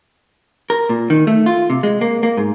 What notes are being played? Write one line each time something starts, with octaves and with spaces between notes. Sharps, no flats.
A#4
A#2
D#3
A3
F4
C3
G#3
A#3
A#3
G#2